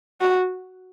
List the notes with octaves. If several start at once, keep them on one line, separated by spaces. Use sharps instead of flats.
F#4